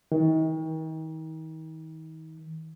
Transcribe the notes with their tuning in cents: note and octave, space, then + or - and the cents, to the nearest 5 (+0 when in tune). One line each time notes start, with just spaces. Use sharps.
D#3 +40